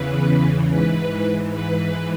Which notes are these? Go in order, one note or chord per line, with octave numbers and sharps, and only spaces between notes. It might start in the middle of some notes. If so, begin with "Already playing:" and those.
Already playing: E2 C#3 E3 B4
G#2 E3 B4
B4